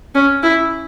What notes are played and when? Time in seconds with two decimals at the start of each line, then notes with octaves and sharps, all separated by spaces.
0.15 C#4
0.43 E4